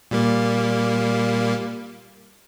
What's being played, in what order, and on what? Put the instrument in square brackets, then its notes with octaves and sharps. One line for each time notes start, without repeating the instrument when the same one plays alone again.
[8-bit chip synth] A#2 G3 A#3